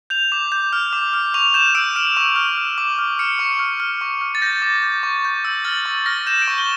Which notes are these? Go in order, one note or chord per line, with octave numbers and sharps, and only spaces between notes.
G6 F7
D6
G6
F6
D6
F6
C#6 F7
G6 E7
E6 D7
F6 D7
C#6
F6
F6
D6
F6
F6 C#7
C#6
F6
F6
C#6
F6
A6
G6 A#6
D6
G6
C#6
G6
E6
F6 A6
C#6
F6 A#6
G6 E7
D7
C#6
G7